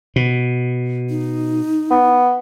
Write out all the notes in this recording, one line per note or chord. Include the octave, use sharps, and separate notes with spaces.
B2
D#4
B3